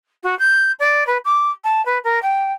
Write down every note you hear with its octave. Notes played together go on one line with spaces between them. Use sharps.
F#4
G6
D5
B4
D6
A5
B4
A#4
G5